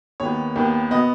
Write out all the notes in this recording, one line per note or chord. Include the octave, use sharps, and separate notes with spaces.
D#2 D#3 B3 C#5
D#2 D#3 B3
B2 B3 D#5